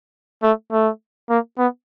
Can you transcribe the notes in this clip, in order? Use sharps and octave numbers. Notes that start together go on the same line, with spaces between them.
A3
A3
A#3
B3